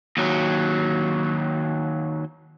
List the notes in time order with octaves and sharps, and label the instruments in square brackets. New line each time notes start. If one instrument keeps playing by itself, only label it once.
[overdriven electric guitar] D#2 F#3